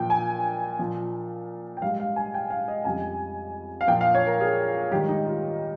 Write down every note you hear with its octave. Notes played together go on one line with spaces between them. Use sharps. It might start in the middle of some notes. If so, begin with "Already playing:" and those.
Already playing: A#2 F3 G5
G#5
A#2 F3
G5
G#2 G3 F5
F5
G#5
G5
F5
D#5
F2 C#3 G3 G#5
F5
A#2 F3 G5
F5
C#5
A#4
G#4
G#2 D#3 G3 G4
D#4
F4